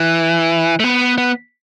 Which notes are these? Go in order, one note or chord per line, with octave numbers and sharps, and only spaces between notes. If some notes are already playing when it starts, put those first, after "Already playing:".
Already playing: E3
A3
B3
B3